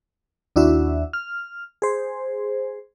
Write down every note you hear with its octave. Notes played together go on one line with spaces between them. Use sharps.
D#2 D4 E4 F#4 E5
F6
G#4 C5